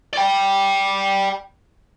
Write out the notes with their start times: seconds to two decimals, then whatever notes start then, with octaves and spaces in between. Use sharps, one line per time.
0.13 D5 G5